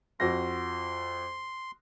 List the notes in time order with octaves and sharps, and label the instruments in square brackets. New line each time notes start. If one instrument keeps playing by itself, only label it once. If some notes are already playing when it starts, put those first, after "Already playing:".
[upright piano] F2 F#4 A#6 [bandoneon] C6